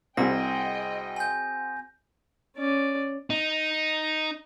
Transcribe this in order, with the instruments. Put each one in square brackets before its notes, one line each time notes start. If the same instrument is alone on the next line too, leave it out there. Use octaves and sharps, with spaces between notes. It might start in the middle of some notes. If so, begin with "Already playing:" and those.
[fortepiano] C2 [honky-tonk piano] C4 F#4 G#4 [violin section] D#5 G5 [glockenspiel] A#6
[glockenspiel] G#5 G6
[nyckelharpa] C#4 D5
[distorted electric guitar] D#4